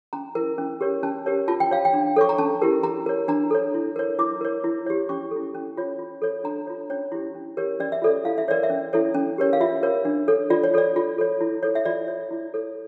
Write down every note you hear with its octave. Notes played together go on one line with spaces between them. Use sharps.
C#4 A#5
E4 A#4
C#4
G4 A#4 C#5
C#4 A5
G4 A#4 C#5
F4 A5
G5
C#5 F5
G5
D4
A4 C#5 C#6
A#5
C#4 A5
E4 G4 A#4
E4 A#5
A#4 C#5
D4 A#5
A4 C#5
E4
A#4 C#5
E4 D6
A#4 C#5
E4
G4 C#5
C#4 C#6
A4
E4
C#4
F4 C#5
F4
A4 C#5
D4 A#5
F4 C#5
C#4 C#5
E4 G4
C#4
G4 A#4 C#5
C#4 D5
E5
F4 A4 C#5 D5
E4 F5
E5
A#4 C#5 D5
E5
C#4
E4 A4 C#5
C#4
G4 A#4 C#5
F5
F4 E5
A#4 C#5
D4
A4 C#5
F4 D5
C#5
A4 C#5 D5
F4
A4 C#5
E4
A4 C#5
E5
F4 D5
C#5
E4
A4 C#5